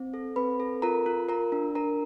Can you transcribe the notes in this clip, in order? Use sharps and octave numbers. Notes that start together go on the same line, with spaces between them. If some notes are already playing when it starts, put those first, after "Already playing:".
Already playing: C4
A4
C4 B4 B5
A4
F4 A#4 A#5
F4
F4 A#4 A#5
D4
D4 A#4 A#5